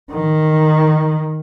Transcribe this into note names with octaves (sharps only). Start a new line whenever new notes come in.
D#3